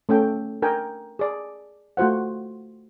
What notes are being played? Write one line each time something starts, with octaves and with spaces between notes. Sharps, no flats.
A3 C#4 A4 G5
D4 A#4 G5 G#5
G#4 D5
A3 F4 F#4 C5 F#5